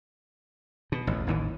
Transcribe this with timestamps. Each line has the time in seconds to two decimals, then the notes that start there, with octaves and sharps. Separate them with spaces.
0.92 B2
1.07 A1 E2
1.27 A1 D#2 E3